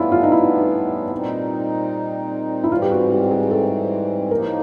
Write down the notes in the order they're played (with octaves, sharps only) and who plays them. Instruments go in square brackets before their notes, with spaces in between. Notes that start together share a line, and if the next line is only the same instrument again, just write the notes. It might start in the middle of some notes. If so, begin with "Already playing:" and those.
Already playing: [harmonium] A2 E3 G3 B3 D4 [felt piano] E4 F4
[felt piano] F4
D#4
E4
[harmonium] A#2 G3 C4 D#4
[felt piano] E4
[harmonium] G#2 E3 G3 C4 [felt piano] F4
[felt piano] G4
F#4
G4
G#4
A4
[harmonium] A2 F3 A#3 D#4 [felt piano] A#4